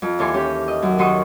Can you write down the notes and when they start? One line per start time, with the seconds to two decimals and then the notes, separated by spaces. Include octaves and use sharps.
0.02 F2
0.19 D#2 E3 A4 G#5 C6
0.34 C#4 G4
0.68 D#5
0.82 F#2
0.98 D#3 D#4 F#4 C6 C#6 D#6